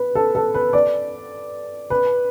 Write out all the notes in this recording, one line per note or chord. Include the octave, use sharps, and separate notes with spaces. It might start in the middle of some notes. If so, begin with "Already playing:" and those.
Already playing: B4
A4
A4
B4
D5
B4